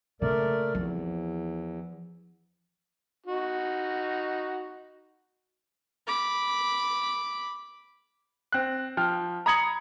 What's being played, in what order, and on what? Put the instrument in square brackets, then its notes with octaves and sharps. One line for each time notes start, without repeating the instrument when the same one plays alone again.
[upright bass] C#3 A#3 [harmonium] A3 A#4 D5
[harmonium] E2 [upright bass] F3 C4
[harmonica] D#4 F#4
[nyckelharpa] B5 D6
[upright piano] C4 F#6
F3 G5 F6
A#5 B5 D#6 G#6 C#7 F#7